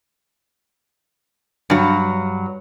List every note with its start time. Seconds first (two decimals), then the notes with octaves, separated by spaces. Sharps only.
1.70 G2 F#3